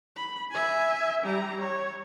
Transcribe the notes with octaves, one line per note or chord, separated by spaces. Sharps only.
B5
E5 G#5
G3 A#5
C#5